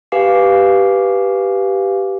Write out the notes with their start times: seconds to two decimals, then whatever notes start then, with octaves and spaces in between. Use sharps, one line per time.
0.12 G4 B4 F5 G#5 D6 C7